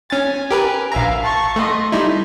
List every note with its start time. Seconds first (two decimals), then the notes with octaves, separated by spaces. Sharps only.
0.10 C#4 G#5 A6
0.51 G4 A#4 B4
0.92 A#1 E5 F5 A#5
1.23 A5 C#6
1.56 A3 D#5 C6
1.92 G3 D#4 E4